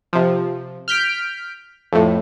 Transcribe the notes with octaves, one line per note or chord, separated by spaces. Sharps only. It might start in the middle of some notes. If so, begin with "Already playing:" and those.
C3 F3
F6 G6 B6 D7
F2 A2